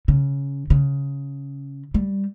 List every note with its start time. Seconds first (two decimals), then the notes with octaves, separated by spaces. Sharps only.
0.08 C#3
0.70 C#3
1.94 G3